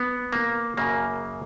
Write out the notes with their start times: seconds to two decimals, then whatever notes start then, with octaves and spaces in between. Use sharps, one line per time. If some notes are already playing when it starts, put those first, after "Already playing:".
Already playing: B3
0.33 A#3
0.77 F#2 C#3 F#3 A#3